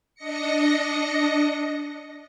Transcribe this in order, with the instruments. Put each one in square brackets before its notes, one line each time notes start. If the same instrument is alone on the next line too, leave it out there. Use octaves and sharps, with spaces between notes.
[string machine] D4 D#5 A#6 C#7